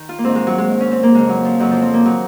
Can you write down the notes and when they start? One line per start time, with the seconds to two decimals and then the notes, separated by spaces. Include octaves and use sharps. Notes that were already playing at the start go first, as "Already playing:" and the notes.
Already playing: D#3 D#4
0.09 F4
0.18 A#3
0.24 G#2 D#3 C4
0.35 G#3
0.47 F#3
0.58 G#3
0.69 G#2 D#3
0.81 C#4
0.92 C4
1.03 A#3
1.14 F2 C#3 G#3
1.29 F#3
1.45 F3
1.60 F2 C#3 F#3
1.71 F3
1.82 C4
1.94 A#3
2.05 D#3 F#3